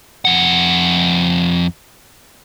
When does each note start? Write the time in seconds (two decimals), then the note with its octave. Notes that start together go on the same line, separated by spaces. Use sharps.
0.25 F2 F#5